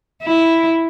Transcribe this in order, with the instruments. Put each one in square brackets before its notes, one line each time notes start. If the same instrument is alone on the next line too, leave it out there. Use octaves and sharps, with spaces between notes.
[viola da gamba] E4